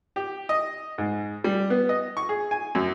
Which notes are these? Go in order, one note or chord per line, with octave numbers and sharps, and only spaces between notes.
G4
D#5
G#2
G3
B3
D#5
C#6
G#4
G#5
F#2